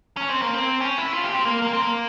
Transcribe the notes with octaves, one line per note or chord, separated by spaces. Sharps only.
C#4
C4
A#3
C4
C#4
E4
F4
G4
C4
A#3
A#3
C4
A#3